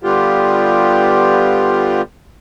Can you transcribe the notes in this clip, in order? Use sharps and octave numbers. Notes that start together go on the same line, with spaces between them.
D3 G3 B3 F4 G4